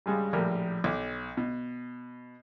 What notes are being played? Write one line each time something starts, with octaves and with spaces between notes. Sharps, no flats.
G2 C#3 G3 G#3
A#1 A2 G4 A#4
B1 D6
B2